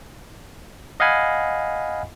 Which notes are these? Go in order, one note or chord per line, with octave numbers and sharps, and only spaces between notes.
D#5 F5 F#5 G#5 B5